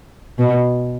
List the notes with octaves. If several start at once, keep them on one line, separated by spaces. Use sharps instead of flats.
B2